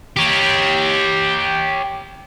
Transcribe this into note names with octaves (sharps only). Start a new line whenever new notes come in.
G4 C#5